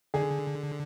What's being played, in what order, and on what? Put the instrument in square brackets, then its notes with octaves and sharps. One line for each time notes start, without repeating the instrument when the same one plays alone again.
[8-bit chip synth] D3 [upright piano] G#4